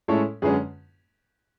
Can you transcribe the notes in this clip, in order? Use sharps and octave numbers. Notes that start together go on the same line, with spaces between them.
A2 G#3 C#4 E4 A4 C#5
F#2 D3 G#3 C#4 G#4 B4